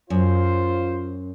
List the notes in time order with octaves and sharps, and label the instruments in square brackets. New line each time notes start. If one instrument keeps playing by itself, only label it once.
[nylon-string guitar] F#2 [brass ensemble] F4 C5